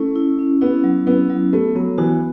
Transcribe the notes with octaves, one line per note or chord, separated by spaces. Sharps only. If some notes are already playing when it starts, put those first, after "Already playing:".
Already playing: A3 C#4 E4
E4
C#4
B3 E4
F#3
B3 E4
F#3
A3 B3
F#3 B3
E3 F#4